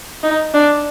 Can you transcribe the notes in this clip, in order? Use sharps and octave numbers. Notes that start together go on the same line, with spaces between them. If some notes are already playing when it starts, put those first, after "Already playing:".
D#4
D4